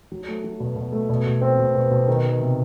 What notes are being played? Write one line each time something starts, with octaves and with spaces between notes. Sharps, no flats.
F#3
A3
F#3
B2
B2
A3
B2
B2
C4
B2
B2
B2
D#3
D#3
C3